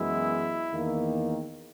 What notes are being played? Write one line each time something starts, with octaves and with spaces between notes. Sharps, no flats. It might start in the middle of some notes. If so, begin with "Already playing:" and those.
Already playing: F#2 E3 G#3 B3 E4
E2 D#3 A#3